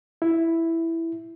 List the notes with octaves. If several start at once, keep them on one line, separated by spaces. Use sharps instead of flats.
E4